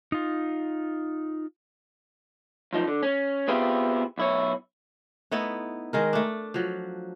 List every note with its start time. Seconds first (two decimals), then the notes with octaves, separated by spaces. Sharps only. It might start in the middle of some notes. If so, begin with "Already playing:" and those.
0.12 D#4 F4
2.73 F#2 F3 D#4
2.87 D3
3.03 C#4
3.48 B3 C4 E4 F4 G4 G#4
4.18 B1 E4 C#5
5.31 A3 B3 D#4 E4
5.93 D#3 G#3 A#4
6.13 A3 D4
6.54 F3 F#3